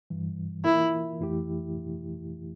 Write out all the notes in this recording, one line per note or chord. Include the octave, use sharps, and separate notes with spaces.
G2 E3 G3
E3 A#3 E4 F4 A#4
F2 E3 A3 E4 G4